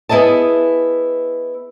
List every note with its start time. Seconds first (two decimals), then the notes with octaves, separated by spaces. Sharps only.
0.09 B3 E4 G#4 D#5 A5